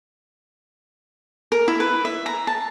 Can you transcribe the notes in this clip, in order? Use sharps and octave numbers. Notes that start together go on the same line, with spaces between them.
A#4
E4
B4
E5
A#5
A5